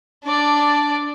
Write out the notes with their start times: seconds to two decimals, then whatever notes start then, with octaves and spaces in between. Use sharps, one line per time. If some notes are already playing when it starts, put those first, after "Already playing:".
0.24 D4 D5